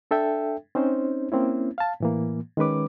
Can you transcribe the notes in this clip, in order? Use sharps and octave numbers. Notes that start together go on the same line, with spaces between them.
D4 A4 E5 G5
C4 C#4 D#4 C5
A#3 C4 C#4 E4
F5 A5
A2 E3 A#3
D#3 G#3 C#4 B4 D6